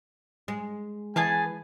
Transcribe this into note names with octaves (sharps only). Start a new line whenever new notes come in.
G#3
E3 B3 G#4 G#5 A5